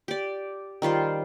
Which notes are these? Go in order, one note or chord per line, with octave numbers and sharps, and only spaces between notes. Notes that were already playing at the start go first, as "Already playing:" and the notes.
G4 D5
D#3 G3 F4 C5